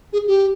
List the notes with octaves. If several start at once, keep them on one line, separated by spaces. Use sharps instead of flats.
G#4
G4